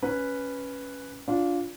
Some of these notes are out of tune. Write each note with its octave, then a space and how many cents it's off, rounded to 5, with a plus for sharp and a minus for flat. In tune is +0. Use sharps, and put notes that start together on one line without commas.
C#4 +0 B4 +0
D4 -20 F4 +5